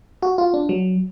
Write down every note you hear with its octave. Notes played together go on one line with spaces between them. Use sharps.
F#4
F4
D4
F#3